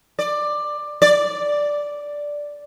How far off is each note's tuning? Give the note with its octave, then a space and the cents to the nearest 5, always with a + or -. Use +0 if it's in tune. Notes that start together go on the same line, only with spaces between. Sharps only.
D5 +15
D5 -5